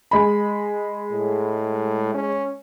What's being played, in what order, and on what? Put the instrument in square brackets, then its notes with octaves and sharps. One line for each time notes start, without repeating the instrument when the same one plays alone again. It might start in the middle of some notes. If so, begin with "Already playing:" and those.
[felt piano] G#3 B5
[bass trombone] A2
C#4